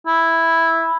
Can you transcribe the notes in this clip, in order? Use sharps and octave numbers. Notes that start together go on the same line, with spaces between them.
E4